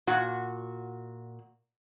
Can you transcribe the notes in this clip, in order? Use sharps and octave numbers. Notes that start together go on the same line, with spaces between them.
A#2 F#4